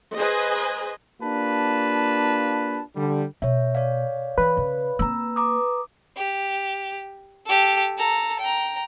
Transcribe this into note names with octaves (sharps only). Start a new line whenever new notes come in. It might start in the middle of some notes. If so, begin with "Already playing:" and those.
G#4 B4 C5 D#5 G#5
A#3 D4 F4 G4 B4 A5
D3 G3
B2 C#5 E5
C#5 D5 F5
E3 B4
C#3
A#3 C4 A#5 E6
A#5 D6 D#6
G4
G4 A4
A4 A#5
G5 A#5